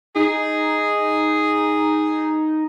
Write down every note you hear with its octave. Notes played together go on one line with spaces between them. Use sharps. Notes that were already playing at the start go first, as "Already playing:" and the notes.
D#4 G#4